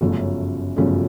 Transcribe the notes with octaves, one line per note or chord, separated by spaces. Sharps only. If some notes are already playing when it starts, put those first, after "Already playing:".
G1 F#2 C#3 F3 A3
G1 F#2 C#3 F3 A3